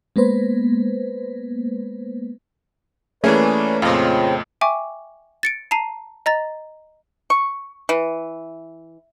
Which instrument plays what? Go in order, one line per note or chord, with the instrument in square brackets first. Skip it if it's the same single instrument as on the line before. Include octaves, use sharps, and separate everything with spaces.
[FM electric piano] G#3 A#3 B3 B4 C5
[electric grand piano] E3 A#3 C#4 [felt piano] A3 [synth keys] G#4 [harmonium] B4 C#5 D5
[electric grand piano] F2 A#2 [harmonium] C#3 C4 G5 [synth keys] F4 D#5
[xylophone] E5 G5 G#5 C#6 D6
A6 C#7 D7
A5 A#5 C7 D#7
D#5 A#5 A6
[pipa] C#6
E3